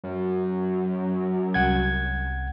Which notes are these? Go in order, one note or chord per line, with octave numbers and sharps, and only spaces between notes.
F#2
C2 F#5 G#6